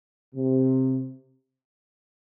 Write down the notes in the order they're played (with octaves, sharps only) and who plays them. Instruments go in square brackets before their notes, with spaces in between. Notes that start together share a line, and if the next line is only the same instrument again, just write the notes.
[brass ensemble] C3